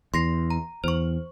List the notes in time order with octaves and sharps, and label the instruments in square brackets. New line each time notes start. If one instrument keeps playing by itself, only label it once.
[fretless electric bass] E2 [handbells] C6 A#6 C7
[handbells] A#5
[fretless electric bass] E2 [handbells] C5 C#6